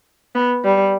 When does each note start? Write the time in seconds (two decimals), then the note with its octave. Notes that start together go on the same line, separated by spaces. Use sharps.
0.35 B3
0.64 G3